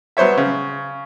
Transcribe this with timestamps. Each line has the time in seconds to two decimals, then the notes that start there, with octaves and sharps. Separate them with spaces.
0.17 F#3 B3 C5 C#5 E5
0.37 C#3